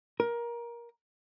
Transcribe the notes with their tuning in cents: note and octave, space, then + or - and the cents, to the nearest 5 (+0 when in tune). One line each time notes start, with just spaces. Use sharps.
A#4 +20